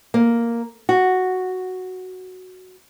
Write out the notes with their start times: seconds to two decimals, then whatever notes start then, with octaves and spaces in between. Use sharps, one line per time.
0.14 A#3
0.89 F#4